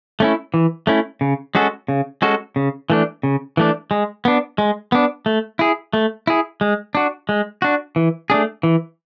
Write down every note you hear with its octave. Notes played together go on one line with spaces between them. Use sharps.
A3 C#4 E4
E3
A3 C#4 E4
C#3
G#3 C#4 F#4 A4
C#3
G#3 C#4 F#4 A4
C#3
E3 A3 D4
C#3
E3 A3 D4
G#3
B3 D4
G#3
B3 D4
A3
E4 G#4
A3
E4 G#4
G#3
D4 F#4
G#3
D4 F#4
E3
A3 D4 G#4
E3